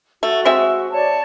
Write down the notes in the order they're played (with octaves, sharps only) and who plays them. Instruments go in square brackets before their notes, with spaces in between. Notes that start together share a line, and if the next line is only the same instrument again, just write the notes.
[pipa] A3 [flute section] F#4
[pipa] G#3 C4 E5
[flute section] C#5 D5 A5